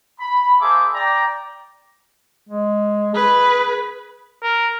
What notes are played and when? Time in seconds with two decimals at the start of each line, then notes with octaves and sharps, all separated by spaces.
0.20 B5
0.61 A#3 G#4 C5 E5 A5 D6
0.94 D5 G5 A#5
2.49 G#3
3.15 G#4 B4
4.43 A#4